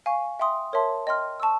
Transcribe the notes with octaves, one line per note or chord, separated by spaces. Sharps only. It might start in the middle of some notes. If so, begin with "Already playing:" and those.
F5 G#5 C#6
E5 G5 C6 D#6
A#4 C#5 E5 A5 C6
D#5 G5 C6 F6
A5 C#6 E6